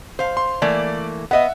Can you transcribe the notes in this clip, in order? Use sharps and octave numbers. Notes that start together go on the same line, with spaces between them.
C5 F5
C6
E3 A3 A#3 D5
B3 D#5 E5 F#5